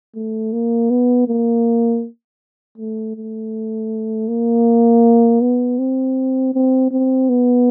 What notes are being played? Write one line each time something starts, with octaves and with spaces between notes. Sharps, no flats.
A3
A#3
B3
A#3
A3
A3
A#3
B3
C4
C4
C4
B3